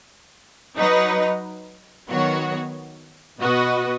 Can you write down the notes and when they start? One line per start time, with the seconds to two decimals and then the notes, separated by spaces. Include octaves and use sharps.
0.76 F#3 D#4 B4 D#5
2.08 D#3 F#3 B3 F#4 C#5
3.41 B2 B3 F#4 B4 D#5